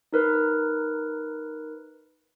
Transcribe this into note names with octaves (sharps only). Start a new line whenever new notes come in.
D#4 A#4 B4